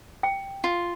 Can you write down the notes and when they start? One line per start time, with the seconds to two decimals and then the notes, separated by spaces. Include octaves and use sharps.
0.23 G5
0.64 F4